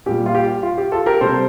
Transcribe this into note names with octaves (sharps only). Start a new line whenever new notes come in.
A#2 G3 G4
F4
G4
F4
G4
F4 A4
G4 A#4
C3 G3 A4 C5